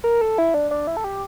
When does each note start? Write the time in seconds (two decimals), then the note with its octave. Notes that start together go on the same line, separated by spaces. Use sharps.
0.04 A#4
0.21 A4
0.38 E4
0.54 D4
0.71 D4
0.87 E4
0.97 A4
1.04 G4